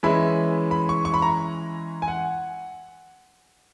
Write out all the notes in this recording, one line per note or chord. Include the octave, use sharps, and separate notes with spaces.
E3 G#3 C#4 E4 B5
B5
C#6
C#6
B5
A#5
G#5
F#5